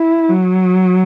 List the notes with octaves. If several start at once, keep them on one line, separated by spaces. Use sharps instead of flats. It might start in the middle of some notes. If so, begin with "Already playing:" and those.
Already playing: E4
F#3